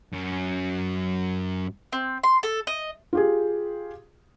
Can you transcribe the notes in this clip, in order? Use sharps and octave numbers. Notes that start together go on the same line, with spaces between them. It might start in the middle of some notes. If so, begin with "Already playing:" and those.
F#2 F#3
C4
C6
A4
D#5
F4 G4 G#4